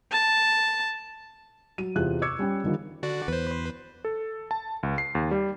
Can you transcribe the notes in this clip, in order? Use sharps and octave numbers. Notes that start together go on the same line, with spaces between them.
A5
F#3 D#7
E2 C3 F4 G#4 F#6
C#6 D6 E6 G#6 C#7
G3 C#4 G5
D3 D#3 F3 G3
D3 F#4 D5
E2 B4 C5
A4
A5
C#2
C7
D#2
G3